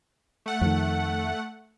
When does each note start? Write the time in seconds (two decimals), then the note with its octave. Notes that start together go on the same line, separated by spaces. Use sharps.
0.46 A3 F#5
0.61 F2 D#3